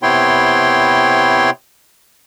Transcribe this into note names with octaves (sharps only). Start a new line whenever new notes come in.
C3 B3 E4 C#5 G5 C6